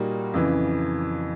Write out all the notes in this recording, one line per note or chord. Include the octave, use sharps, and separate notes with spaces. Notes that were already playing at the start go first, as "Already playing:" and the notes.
Already playing: A#2 G3 A#3 D#4 F#4
F2 C#3 E3